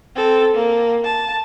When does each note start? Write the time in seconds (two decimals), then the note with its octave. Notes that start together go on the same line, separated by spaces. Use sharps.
0.16 C4 A4
0.54 A#3
1.05 A5